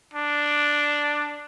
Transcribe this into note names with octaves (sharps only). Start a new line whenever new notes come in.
D4